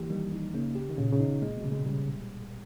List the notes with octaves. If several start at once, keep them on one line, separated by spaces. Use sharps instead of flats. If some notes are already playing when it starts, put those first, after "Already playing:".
Already playing: E3 A#3 G4
D#3 G3
D#4
C#3 A#3
G4
D#3
A#2 C#3
C#3
D#4
B2
A#2 G#3
B2
C#3
G#3
C#3 G3